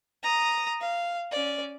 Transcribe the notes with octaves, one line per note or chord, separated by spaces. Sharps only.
A#5 D#6
F5
C#4 D5